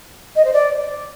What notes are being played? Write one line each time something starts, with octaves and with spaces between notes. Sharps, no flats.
D#5
C5
D5